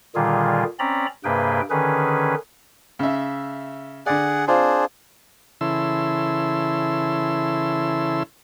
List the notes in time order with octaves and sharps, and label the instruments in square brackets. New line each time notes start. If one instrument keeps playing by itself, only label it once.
[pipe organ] A#2 D3 D#3 G3 F4 G#4
C4 C#4 D5 A#5 B5
G2 C3 A#3 G#4 B4 G5
D3 D#3 C#4 G#4 B4
[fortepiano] C#3 E5
[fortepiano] D3 D5 [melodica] G#4 F#5
[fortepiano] C4 F4 [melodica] D4 G#4 C5
[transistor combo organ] C#3 E3 E4 A4 C6 E6